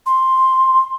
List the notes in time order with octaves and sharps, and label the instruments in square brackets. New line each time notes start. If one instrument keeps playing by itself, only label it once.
[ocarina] C6